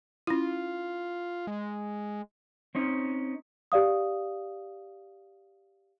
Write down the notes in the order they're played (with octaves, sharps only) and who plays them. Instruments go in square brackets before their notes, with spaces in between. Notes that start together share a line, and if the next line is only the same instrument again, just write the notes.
[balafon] C#4 E4 [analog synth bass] F4
[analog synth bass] G#3
[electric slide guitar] C4 C#4 D#4
[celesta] G4 D5 F5 D#6